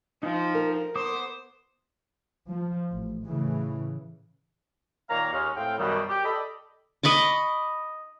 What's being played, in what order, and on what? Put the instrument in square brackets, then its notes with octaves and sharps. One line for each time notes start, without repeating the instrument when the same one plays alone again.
[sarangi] F3 [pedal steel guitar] D#4 G5
[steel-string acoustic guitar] A#4
[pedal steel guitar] B3 D6 D#6 [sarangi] C5
[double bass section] F3
A1
A2 C#3 E3
[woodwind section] A#2 D#3 A#3 C#5 F5 A#5
D#2 G#3 C#4 F6
A2 C4 F5 G5
F#2 B2 D#3 G3
G4
A4 D5 D#5 B5
[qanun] D#5 B5 C#6 D6